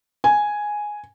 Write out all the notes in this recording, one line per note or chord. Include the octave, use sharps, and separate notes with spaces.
G#5